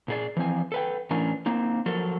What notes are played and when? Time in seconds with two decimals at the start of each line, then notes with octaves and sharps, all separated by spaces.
0.08 A#2 G#4 D5
0.37 E3 F3 C4 G#5
0.72 A4 B4 G5
1.10 A2 E3 C#4 D4 A#4 G#5
1.46 A#3 C4 D#4
1.86 F3 F#3 A4 A#4